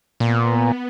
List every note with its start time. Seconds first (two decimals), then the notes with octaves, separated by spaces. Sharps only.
0.20 A#2 B3